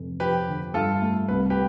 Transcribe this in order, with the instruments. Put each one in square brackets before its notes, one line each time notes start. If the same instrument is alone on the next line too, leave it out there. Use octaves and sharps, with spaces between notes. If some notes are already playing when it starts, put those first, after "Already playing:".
Already playing: [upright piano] F1
[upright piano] F3 [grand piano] G4 B4
[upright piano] D3
[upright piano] G2 [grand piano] F4 A4
[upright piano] A3
[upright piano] C2 [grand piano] B4
[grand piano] G4 B4